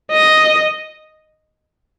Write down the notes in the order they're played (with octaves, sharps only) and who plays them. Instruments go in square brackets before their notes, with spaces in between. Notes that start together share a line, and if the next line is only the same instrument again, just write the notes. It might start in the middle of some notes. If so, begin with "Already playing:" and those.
[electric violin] D#5